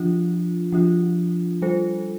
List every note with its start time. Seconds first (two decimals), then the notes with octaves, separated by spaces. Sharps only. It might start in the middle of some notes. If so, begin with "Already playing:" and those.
Already playing: F3 D4 F4
0.72 F3 D4 F4
1.62 G3 F4 A4 C5